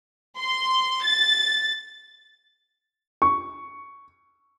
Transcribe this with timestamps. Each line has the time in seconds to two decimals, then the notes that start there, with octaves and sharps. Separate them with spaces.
0.38 C6
1.04 A6
3.22 C#6